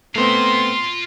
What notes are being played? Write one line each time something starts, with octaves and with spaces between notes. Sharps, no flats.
A3 B3 C4 F4 A#5 C6